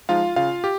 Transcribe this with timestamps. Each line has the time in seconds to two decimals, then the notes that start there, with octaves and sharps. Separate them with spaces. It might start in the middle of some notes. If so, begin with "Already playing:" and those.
0.09 F3 G#3 D#4 F4 F5
0.36 C#3 F4 F5
0.64 G4